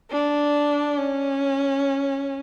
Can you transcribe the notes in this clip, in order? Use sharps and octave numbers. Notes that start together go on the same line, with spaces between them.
D4
C#4